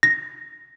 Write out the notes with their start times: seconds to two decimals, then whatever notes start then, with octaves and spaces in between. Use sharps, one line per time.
0.03 A#6